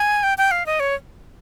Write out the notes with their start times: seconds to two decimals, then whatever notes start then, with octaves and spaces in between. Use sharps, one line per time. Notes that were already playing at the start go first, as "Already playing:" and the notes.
Already playing: G#5
0.23 G5
0.38 G5
0.51 F5
0.66 D#5
0.80 C#5